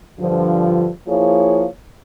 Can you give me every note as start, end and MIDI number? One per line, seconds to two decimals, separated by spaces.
0.20 0.88 43
0.20 0.88 50
0.20 0.88 53
1.08 1.66 53
1.08 1.66 58
1.08 1.66 64
1.08 1.66 68
1.08 1.66 73